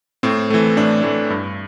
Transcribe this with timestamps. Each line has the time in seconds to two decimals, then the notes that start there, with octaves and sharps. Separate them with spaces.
0.23 A2 C4
0.50 E3 A3
0.77 A2 D4
1.03 E3 A3
1.30 G2